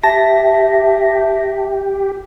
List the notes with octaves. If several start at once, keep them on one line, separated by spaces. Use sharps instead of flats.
G4 E5 A5 A#6